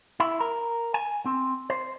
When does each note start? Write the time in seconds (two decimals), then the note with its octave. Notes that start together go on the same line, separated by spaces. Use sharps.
0.20 E4
0.40 A#4
0.94 G#5
1.26 C4
1.70 C5